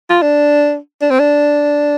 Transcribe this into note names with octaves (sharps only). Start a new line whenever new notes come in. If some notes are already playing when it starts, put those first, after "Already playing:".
F4
D4
D4
C4
D4